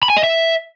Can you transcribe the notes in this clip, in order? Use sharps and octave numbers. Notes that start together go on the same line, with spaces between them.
B5
G#5
D#5
E5